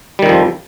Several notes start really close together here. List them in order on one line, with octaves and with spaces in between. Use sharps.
G3 D#3 F2 F3